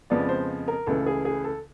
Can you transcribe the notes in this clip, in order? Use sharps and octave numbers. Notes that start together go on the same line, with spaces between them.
F2 C#3 F3 G#3 B3 D5
C5
A#4
C#2 C#3 E3 A3 A4
G#4
G#4
A4